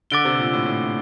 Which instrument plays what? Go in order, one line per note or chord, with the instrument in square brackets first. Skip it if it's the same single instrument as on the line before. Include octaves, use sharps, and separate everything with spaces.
[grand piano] D3 [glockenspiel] D6 A6 D7 G7
[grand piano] C3
A#2
A2
A2